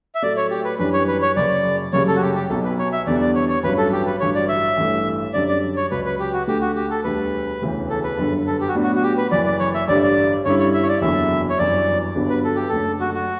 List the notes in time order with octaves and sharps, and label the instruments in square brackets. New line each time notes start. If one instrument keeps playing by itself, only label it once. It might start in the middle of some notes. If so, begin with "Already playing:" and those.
[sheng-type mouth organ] E5
[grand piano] A2 F#3 A3 [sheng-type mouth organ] D5
[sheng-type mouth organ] C#5
G4
B4
[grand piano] F#2 E3 G3 D4 [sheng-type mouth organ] B4
[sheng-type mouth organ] C#5
B4
C#5
[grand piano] F#1 F#2 C#3 [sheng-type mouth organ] D5
[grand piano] F#1 F#2 C#3 G3 [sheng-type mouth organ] C#5
[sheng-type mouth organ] A4
F#4
G4
G4
[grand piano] B1 B2 F#3 [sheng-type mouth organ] A4
[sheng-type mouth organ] B4
C#5
E5
[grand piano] E2 D3 G3 B3 D4 [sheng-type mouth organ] D5
[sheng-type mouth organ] D5
C#5
C#5
[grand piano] A1 G2 F#3 C#4 [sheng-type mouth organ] B4
[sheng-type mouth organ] A4
G4
B4
[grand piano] A1 G2 D3 F#3 [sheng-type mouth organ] C#5
[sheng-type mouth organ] D5
E5
[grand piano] A1 G2 E3 A3
[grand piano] F#2 D3 G3 C#4 [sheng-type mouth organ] D5
[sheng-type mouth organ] D5
C#5
[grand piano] C#2 C#3 F#3 [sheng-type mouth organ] B4
[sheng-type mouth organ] B4
G4
F#4
[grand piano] D2 D3 A3 [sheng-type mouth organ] G4
[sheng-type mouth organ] F#4
G4
A4
[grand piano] E1 D2 D3 G3 [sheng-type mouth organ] B4
[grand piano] E1 D2 C#3 E3
[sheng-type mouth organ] A4
B4
[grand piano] G1 F#2 D3
[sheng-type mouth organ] A4
G4
F#4
[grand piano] A2 F#3 B3 D4
[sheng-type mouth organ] F#4
F#4
G4
B4
[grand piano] F#1 F#2 E3 [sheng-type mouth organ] D5
[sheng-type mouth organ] D5
C#5
E5
[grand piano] A1 G2 D3 G3 [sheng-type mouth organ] D5
[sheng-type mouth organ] D5
[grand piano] G2 D3 G3 C#4 E4 [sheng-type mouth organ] C#5
[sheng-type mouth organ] C#5
E5
C#5
D5
[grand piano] F#1 E2 D3 F#3 [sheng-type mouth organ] E5
[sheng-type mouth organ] C#5
[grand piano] G1 F#2 E3 [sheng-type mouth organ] D5
[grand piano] G1 G2 D3 F#3 B3
[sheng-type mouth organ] B4
A4
G4
[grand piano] F#1 F#2 D3 A3 [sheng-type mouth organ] A4
[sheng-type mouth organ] F#4
F#4